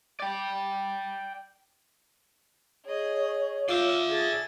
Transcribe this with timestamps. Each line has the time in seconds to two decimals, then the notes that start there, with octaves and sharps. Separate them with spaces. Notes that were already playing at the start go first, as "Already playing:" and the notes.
0.20 D5 G5
2.85 G#4 C#5 D#5
3.69 F4 D5 E5 G6
4.08 G#4 A4 G#5 A6